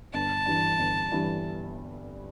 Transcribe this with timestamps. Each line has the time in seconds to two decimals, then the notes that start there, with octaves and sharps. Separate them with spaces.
0.13 G1 A5
0.46 G2 E3 G3
0.79 G1
1.12 G2 E3 G3